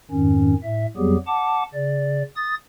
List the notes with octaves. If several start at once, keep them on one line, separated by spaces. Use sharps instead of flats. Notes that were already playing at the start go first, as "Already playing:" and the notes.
F2 G#2 D#3 C#4
A2 E5
F2 F#3 G3 B3 G4 G#4
F#5 A5 D6
C#3 D5
D#6 A6